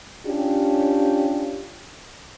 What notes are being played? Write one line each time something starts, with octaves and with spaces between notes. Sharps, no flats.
C#4 D4 F4 G4